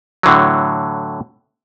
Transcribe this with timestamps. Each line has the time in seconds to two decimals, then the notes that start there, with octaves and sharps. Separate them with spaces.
0.23 A2 D3 E3 F#3